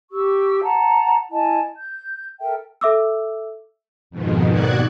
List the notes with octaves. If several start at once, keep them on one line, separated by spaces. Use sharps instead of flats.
G4 C#6 E6
F#5 A5 A#5
E4 D#5 G#5 A5
G6
A4 A#4 E5 G5
A4 E5 D6 E6
F2 G#2 B2 D#3
D#2 D#3 F#4 D5 F#6 G#6